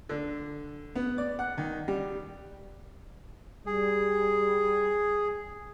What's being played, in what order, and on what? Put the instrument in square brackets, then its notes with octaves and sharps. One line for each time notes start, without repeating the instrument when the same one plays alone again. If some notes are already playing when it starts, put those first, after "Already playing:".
[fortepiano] D3
B3
D5
F#5
D#3
G3
[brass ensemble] G3 [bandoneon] G#4